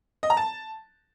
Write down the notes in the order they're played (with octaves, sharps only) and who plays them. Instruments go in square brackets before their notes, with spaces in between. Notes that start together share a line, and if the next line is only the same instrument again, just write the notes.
[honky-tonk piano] D#5
A#5
A5